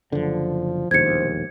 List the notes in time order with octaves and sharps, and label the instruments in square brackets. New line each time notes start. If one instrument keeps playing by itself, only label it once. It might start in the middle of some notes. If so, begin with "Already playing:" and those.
[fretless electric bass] F#1 D3 [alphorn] F3
[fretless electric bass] E1 A#1 D#2 [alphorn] C5 [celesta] G#6 C#7